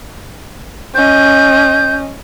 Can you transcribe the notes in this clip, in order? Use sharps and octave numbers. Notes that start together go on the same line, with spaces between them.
C#4 D#5 G6